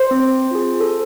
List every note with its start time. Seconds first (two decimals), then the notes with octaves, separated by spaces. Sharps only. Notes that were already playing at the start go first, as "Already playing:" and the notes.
Already playing: C5
0.11 C4
0.51 F4 G#4
0.80 A4